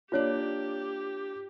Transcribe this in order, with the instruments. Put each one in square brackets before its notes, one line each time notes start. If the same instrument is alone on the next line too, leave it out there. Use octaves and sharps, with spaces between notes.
[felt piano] A#3 D4 D5 [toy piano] F4 C#5 [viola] G4